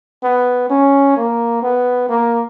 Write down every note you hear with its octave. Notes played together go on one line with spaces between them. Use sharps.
B3
C#4
A#3
B3
A#3